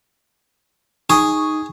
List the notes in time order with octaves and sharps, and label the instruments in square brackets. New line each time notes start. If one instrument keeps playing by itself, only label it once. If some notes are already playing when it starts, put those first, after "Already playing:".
[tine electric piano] D#4 D#6 [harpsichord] G#4 [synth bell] C#6